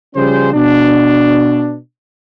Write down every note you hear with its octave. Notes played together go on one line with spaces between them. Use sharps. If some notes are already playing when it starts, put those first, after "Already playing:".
C#3 F3 G3 C#4 G#4 C5
B2 D4